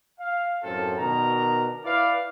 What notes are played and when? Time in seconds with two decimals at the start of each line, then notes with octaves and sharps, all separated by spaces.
0.20 F5
0.63 F#2 A2 C4 F4 A4
0.98 B2 D#3 D4 A#4 A#5
1.85 E4 B4 D5 F5